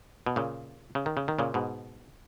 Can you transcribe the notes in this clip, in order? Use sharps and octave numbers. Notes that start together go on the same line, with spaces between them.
B2
A#2 C#3
C#3
D#3
C#3
D#3
A#2 C#3
G#2 B2